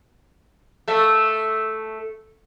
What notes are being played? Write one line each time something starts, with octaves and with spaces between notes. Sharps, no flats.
A3 E5